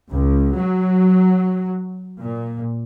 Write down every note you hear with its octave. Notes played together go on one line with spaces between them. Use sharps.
C#2
F#3
A#2